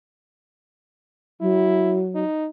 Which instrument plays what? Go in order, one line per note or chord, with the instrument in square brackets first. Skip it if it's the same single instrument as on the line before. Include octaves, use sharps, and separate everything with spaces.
[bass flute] F#3 [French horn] E4
[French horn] D#4